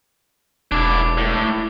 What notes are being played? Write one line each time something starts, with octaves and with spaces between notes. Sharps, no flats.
E1 D4 E4 D6
A2